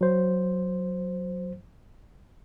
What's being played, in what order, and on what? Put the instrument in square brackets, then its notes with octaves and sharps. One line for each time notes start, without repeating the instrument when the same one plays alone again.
[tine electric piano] F#3 C5